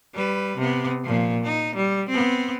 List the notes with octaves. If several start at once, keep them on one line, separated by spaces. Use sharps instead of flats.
G3 B4
C3 B3
A#2 F3
D#4
G3
B3 C4